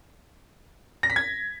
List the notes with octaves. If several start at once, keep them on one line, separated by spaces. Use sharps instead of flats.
A#6
B6
G#6